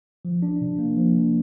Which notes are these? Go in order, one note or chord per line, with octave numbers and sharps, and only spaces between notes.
F3
D4
C3
A#3
F3
D4